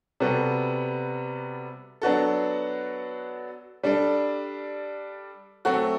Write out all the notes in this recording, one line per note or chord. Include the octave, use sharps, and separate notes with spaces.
C3 G3 B3 F#4 A4
F#3 B3 D4 F#4 A4
G3 D4 A4
F#3 A3 C4 F#4 A4